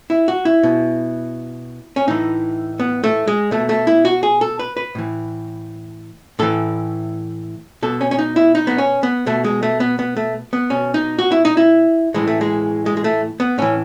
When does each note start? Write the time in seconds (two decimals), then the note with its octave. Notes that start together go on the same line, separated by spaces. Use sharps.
0.10 E4
0.28 F#4
0.45 E4
0.63 B2
1.96 C#4
2.08 A2 E3 D#4
2.80 B3
3.04 A3
3.28 G#3
3.51 B2 A3
3.69 A3
3.87 E4
4.05 F#4
4.23 G#4
4.41 A4
4.59 B4
4.77 B4
4.95 A2 E3
6.39 A2 E3 A4
7.83 B2 A4
8.01 C#4
8.11 C#4
8.19 D#4
8.36 E4
8.55 D#4
8.67 B3
8.78 C#4
9.03 B3
9.26 B2 A3
9.44 G#3
9.63 A3
9.80 B3
9.99 B3
10.17 A3
10.53 B3
10.70 B2 C#4
10.94 D#4
11.19 F#4
11.32 E4
11.45 D#4
11.57 E4
12.14 A2 E3 G#3
12.27 A3
12.41 G#3
12.86 G#3
12.97 G#3
13.04 A3
13.40 B3
13.58 A2 E3 C#4